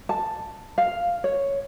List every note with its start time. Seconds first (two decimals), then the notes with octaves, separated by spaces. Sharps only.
0.09 A5
0.78 F5
1.24 C#5